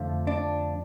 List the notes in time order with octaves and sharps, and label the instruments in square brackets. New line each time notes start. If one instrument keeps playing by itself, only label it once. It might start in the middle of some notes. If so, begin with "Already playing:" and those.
Already playing: [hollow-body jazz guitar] F2 D3 F3 A3
D4